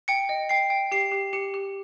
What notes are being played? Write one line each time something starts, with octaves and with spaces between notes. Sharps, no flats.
G5 C#7
D#5
G5 C7
G5
G4 C7
G4
G4 C#7
G4